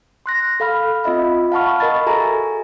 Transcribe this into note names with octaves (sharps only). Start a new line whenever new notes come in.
C6 F#6 A#6
A4 F5 B5 F6
C4 F4 D#5 E5 B5
F5 F#5 A5 B5 C#6 F6
A#4 D#5 B5 C#6 A6
F#4 G#4 A4 E5 G#5 A#5